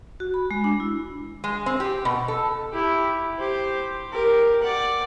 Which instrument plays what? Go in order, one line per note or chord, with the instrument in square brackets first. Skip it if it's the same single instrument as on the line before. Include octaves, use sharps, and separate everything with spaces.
[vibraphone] F#4
B5
G#3
D4
E4
[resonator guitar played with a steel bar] G#3
C4
G4
B2
A4
[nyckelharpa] E4 G4
G4 C5
G4 A#4
D5 F#5